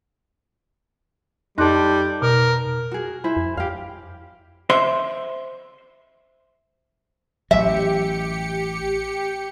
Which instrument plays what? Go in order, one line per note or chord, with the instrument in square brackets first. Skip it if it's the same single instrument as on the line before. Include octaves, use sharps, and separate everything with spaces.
[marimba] F2 C6 F#6 [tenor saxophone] G3 [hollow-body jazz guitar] D#4 A4
[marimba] B2 [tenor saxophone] A#4
[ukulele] F#4 G#4
E4 C5 G#5
[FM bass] F2
[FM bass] F2 [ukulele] G4 F5
[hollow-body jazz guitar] C5 E5 C6
[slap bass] A1 F#3 [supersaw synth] G4 C#7 [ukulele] E5